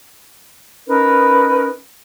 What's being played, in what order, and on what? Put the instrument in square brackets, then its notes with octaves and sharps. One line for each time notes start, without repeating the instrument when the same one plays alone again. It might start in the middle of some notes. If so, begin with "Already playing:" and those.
[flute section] C#4 D#4 A#4 B4